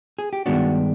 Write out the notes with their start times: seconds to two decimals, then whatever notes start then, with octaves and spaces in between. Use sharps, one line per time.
0.19 G#4
0.33 G4
0.46 G2 D#3 G#3 B3 D4 F#4